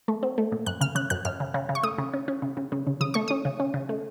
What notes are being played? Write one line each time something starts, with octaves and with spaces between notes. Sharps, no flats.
A3
C4
A3
A#2
F#2 F#6
C#3 F6
C#3 F#6
F#2 F#6
F#2 F6
C#3
C#3
C#3
C#6
A3 D#6
C#3
C#4
C#4
C#3
C#3
C#3
C#3
C#3 D#6
A3 C#6
C#4 D#6
C#3
C#4
C#3
A3